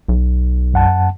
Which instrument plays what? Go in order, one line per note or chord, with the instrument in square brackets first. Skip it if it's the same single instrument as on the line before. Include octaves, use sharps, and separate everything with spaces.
[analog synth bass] B1
[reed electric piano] F#2 F#5 A5